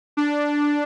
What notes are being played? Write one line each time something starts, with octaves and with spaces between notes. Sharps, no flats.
D4